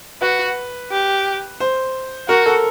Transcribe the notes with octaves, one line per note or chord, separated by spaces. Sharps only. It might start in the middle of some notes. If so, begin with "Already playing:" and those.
F#4 B4
G4
C5
F#4 A#4
A4